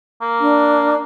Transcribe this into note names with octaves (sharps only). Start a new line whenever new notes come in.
A#3
D4